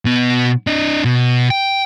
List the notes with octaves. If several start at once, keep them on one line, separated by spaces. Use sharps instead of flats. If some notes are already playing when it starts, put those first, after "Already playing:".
B2 B3
D4 D#5
B2
G5